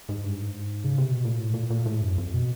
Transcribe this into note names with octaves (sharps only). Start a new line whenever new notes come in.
G#2
G2
G#2
C#3
C3
B2
A#2
A2
A#2
A#2
A2
F#2
F2
B2